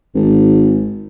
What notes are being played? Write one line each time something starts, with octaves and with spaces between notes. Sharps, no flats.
G#1